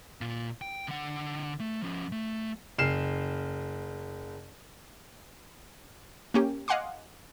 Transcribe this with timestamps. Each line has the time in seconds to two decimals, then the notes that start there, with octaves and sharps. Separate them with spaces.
0.21 A#2 F4
0.61 G5
0.88 D3 F#5
1.61 A3
1.82 F3 C#4
2.12 A3
2.78 F#1 F6 C7 E7
6.34 A#3 C#4 G4
6.68 D#5 F5 F#5 G#5 C6 D6